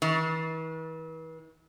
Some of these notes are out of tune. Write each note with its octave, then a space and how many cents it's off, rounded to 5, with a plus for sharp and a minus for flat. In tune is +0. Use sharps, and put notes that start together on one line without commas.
E3 -40